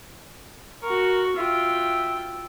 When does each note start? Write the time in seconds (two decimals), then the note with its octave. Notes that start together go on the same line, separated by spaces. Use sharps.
0.83 F#4 A#4 C#6
1.37 F4 E5 G5